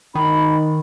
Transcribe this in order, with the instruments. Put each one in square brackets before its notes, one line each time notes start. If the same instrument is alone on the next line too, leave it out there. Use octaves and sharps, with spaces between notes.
[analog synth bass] D#3 [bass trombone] D#4 [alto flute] B5